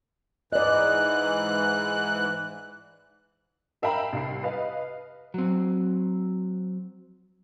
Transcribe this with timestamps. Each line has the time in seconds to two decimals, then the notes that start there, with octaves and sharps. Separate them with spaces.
0.53 G#2 E3 D5 D#5 F#6
3.82 A#4 E5 F5 G5 A#5 B5
4.13 C2 C7
4.43 B4 D#5 F5
5.34 F#3 C4